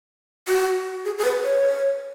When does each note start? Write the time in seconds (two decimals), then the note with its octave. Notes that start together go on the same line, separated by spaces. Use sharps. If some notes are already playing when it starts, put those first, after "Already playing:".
0.48 F#4
1.05 G#4
1.18 G#4
1.24 B4
1.43 C#5